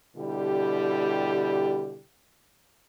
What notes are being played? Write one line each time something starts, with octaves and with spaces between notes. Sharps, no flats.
B2 D3 G3 E4 G4